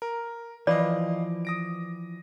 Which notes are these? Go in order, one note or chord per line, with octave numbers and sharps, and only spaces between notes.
A#4
E3 F3 B4 D5 D#5 F5 D6
D#6 A#6 D7